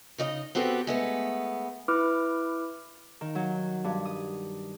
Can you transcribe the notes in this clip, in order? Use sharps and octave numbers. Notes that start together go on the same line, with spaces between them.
C#3 D#4 D5 D#5
B3 C4 F#4 G4 A4 B4
G#3 A3 B3
E4 B4 D6 F6
D#3
F#3
G2
D#6